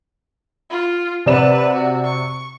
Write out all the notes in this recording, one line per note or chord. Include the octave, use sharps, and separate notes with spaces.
F4
C3 B4 D5 F#5 E7
F#4
C#6